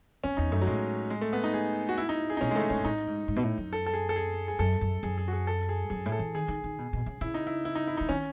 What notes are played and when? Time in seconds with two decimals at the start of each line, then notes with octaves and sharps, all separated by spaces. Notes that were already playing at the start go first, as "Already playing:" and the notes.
0.24 E2 C#4
0.37 E2 D#4
0.52 F#2 A3
0.62 F#3
0.67 A2 G#3
1.10 G#3
1.21 A3
1.33 B3
1.44 D#4
1.54 G#4
1.89 F#4
1.98 E4
2.09 D#4
2.30 G#4
2.37 D#4
2.41 B2 C#4
2.51 G#3
2.56 C#3 A3
2.70 C#3 C#4
2.80 G#2
2.85 A2 D#4
3.07 G#2
3.28 G#2
3.36 B2
3.43 A2
3.58 F#2
3.73 A4
3.86 A4
3.93 G#4
4.09 A4
4.16 G#4
4.48 G#4
4.59 F#2 A4
4.81 F#2
5.03 F#2 G#4
5.18 G#4
5.28 F#4
5.33 G#4
5.47 A4
5.69 G#4
5.90 F#2 G#4
6.06 A2
6.12 A4
6.19 E3
6.35 D#3 G#4
6.48 D#3
6.64 D#3
6.78 B2
6.93 B2
7.06 C#3
7.21 C#3 E4
7.34 D#4
7.47 E4
7.65 E4
7.75 D#4
7.87 E4
7.97 D#4
8.01 C#3
8.09 D#3 C#4